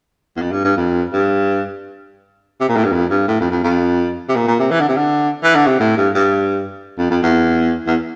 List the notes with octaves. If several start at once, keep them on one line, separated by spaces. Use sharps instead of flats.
E2
F2
G2
G2
F2
G2
C3
A#2
A2
G2
F2
G2
A2
F2
F2
F2
C3
A#2
A#2
C3
E3
D3
C3
D3
E3
D3
C3
A2
G2
G2
F2
F2
E2
E2